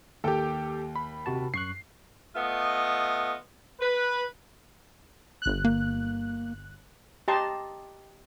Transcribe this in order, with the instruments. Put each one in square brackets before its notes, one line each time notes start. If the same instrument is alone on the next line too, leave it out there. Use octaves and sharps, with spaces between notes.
[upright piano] D#2 G5 [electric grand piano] G4 A4
[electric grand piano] B5
[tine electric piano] C3 F#4 A5
[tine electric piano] F#2 C#6 F#6 [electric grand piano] C7
[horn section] A3 B3 F4 D#5
B4
[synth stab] G1 F#6
[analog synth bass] A#3
[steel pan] G4 D#5 A5 A#5 C6